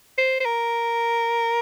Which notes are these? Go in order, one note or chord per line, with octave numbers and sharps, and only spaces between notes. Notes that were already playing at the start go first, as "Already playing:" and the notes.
C5
C5
A#4